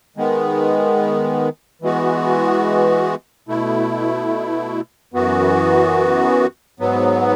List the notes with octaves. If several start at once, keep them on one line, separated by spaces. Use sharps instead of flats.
D#3 G#3 B3
E3 G#3 B3 F#4
B2 A3 E4
F#2 E3 B3 F#4
G#2 F#3 B3